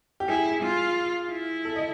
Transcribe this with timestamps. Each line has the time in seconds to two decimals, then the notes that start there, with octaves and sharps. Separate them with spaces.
0.20 G4
0.29 E4 G#4
0.63 F4
1.31 E4
1.65 A4
1.76 D#5